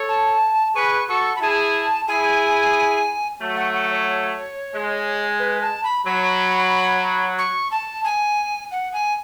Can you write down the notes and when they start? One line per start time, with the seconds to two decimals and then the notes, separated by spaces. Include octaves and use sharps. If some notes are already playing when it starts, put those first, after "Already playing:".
Already playing: A4 C#5
0.09 A5
0.75 G#4 B4 C#6
1.08 F#4 A4 C#6
1.36 B5
1.41 E4 G#4 A5
2.07 E4 G#4 G#5
3.40 F#3 A3
3.56 F#5
3.73 F#5
3.90 C#5
4.73 G#3
5.39 B4
5.61 A5
5.84 B5
6.05 F#3 B5
7.38 C#6
7.71 A5
8.04 G#5
8.71 F#5
8.93 G#5